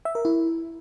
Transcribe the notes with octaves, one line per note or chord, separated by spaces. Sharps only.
E5
A#4
E4